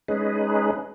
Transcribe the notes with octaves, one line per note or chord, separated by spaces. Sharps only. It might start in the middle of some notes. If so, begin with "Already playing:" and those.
G#3 C#4 D#4 G#4 B4